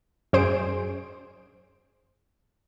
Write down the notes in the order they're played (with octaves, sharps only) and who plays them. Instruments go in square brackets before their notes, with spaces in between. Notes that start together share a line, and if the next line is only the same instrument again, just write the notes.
[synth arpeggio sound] F#2 G#4 C5 D7